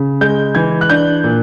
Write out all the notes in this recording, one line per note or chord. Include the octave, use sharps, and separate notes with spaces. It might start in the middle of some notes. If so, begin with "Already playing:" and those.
Already playing: C#3
G#3 G6
E3 G#6
F#6
D4 G6
A#2